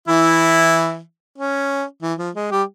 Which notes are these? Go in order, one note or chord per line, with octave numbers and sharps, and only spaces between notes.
E3 E4
C#4
E3
F3
G#3
G3 G4